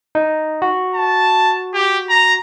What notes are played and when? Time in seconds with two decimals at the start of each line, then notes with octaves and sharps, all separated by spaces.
0.15 D#4
0.62 F#4
0.95 A5
1.74 G4
2.10 A#5